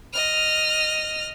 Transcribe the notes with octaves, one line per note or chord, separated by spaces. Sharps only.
D#5 F6